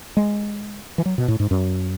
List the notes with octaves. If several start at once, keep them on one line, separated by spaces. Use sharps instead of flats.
G#3
E3
F#3
B2
A2
G#2
F#2